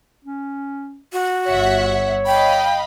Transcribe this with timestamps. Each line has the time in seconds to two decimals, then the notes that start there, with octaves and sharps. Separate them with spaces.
0.25 C#4
1.13 F#4
1.46 G1 C#5 E5 F#5
2.26 D#5 F5 G5 B5